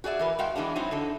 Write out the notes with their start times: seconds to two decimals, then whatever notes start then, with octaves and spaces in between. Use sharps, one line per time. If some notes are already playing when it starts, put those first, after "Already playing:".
0.04 F#4 G#4 D5 E5
0.19 E3 A#4 B4
0.39 G#3 F#4 F5 G5
0.56 E3 G#3 B3 D4
0.76 F#3 C4 D#4 E4
0.91 D3 D#4 A4